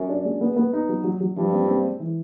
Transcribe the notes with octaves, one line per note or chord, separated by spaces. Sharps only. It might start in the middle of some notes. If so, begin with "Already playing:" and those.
Already playing: F#2
D4
G#3
B3
B3
D#4
F#3
F#3
F#3
G2 F3
C4
C4
G#3
E3